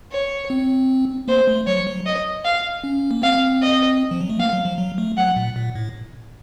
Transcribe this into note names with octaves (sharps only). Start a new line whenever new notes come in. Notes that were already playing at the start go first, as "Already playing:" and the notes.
C#5
C4
A#3 C5
A3
F#3 C#5
F#3
D#5
F5
C#4
A#3
C4 F5
D#5
F3
F#3
A3
A#3 F5
F#3
F3
F#3
A3
F#3 F#5
A#2
A#2
A2